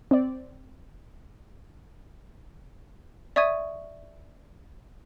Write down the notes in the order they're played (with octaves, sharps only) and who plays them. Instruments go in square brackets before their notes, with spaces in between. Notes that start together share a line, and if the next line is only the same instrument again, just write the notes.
[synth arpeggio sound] C4 D5
[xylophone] D5 E5 C#6 D#6 G#6 D#7